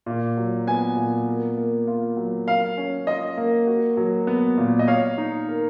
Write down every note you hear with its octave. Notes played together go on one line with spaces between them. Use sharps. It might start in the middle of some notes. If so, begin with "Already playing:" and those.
A#2
F#3
B3 G#5
A#2
A#4
A#3
F4
F#3
A#4 F5
C#4
F4 D#5
A#3
F#4
F#3
B3
A#2
D#5
C#5 F5
D#4
A#4